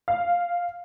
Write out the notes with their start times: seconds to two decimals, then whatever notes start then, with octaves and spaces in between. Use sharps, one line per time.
0.08 F5